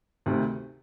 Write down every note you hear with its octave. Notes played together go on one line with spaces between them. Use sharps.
D2 C3 D#3